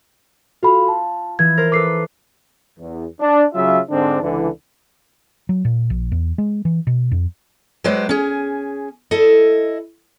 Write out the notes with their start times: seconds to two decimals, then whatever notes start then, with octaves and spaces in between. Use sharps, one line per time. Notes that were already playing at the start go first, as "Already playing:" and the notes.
0.63 F4 F#4 A4 B5
0.88 A5
1.39 E3 G#6
1.57 A#4 C5
1.72 A4 B4 D6 C7
2.79 E2
3.20 D4
3.54 C#3 F#3 F4 E5
3.90 G#2 D3 C4 D4
4.22 C#2 D3 E3
5.49 F#3
5.65 A#2
5.90 A#1
6.12 E2
6.38 G#3
6.65 E3
6.87 B2
7.12 F2
7.84 F#3 G#3 G4 B4 C5
8.09 C#4 G#4
9.11 E4 A4 D#5